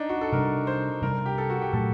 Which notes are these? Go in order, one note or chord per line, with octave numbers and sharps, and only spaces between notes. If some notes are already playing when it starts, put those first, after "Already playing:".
Already playing: D4 D#4
F#4
A4
C3 G3 D4 A#4
C5
C3 G3 A#3 D4 A#4
G4
A4
F#4
G4
A#2 F#3 A3 A4